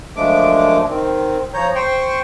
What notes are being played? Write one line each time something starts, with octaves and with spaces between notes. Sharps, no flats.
F#2 F3 G#3 A3 D4 D6
D#3 C4
F3 C#5 A#5 G6
C5 G5 C6 C#6